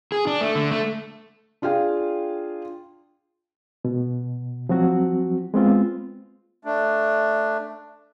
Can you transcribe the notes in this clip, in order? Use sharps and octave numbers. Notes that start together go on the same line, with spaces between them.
G#4
D4
A3
D3
A3
D4 F4 G#4 F5 G5
B2
F3 F#3 C4 F#4
G#3 B3 C4 F4
A3 D4